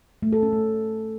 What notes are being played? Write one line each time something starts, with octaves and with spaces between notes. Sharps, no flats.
A3
A4
C#4
A3